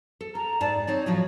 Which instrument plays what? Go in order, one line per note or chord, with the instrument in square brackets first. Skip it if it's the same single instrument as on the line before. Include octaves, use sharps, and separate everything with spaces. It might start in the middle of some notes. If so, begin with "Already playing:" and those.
[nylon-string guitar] A4
[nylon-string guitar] A4 [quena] A#5
[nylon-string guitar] G#2 A5 [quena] D5
[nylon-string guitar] C4 D#4 D5 [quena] C#5
[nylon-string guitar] A2 F3 F#3